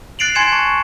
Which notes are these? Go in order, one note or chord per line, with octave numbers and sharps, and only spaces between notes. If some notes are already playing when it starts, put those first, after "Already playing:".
F#6 A6 C7 D7 F7 F#7
G#5 C6 G#6 C#7 E7
A5 C#6